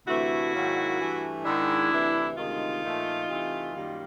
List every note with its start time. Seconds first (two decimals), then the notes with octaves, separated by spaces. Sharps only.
0.08 D2 C3 E3 A3 E4 F#4
0.54 G#2 D#3 F#3 A#3
1.00 G2 E3 A3
1.44 G#2 D#3 G#3 D4 E4
1.91 D2 C3 E3
2.36 D2 C3 D#3 G#3 D#4 F4
2.83 A#2 F3 A3
3.28 C3 E3 A3
3.73 F#2 D#3 G3 A#3